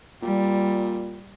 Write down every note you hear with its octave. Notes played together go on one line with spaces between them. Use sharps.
A#2 G3